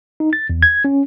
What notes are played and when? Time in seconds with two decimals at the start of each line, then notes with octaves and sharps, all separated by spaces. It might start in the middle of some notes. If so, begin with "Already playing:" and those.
0.20 D#4
0.33 A6
0.50 E2
0.63 G#6
0.85 C#4